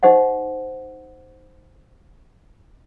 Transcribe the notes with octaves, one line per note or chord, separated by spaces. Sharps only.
D#4 G4 C5 D#5 F#5